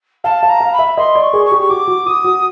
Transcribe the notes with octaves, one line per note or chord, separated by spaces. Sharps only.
F5 A5
F5
A#5
F5
B5
E5
D#5 C6
D5
C#6
G#4
C#6
G4
C#6
F#4 D6
F#4
F#4 D#6
F#4